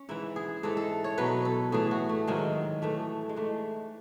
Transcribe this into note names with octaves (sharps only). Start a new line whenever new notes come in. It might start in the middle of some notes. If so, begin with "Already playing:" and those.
Already playing: C#4
G#2 E3 E4
G#4
G#2 E3 A4
A4
C#5
B2 F#3 B4
A4
A2 E3 G#4
F#4
A3
G#2 D#3 F#3 G#3
A2 E3 A3
G#3
G#2 E3 A3